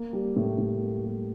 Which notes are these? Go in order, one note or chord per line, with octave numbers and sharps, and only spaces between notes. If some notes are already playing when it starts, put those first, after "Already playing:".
Already playing: A#3
G3
A2
A2
A#3
G3